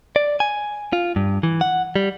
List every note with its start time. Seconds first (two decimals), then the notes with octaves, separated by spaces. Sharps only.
0.16 D5
0.40 G#5
0.93 F4
1.16 G2
1.43 E3
1.61 F#5
1.96 G3